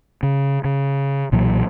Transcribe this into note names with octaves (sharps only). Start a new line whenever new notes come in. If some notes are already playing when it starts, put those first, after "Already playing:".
C#3
C#3
B1 A#2 E3 F#3